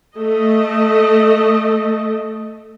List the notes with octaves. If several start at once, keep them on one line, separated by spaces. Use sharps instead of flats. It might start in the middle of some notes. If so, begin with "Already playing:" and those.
A3 D#5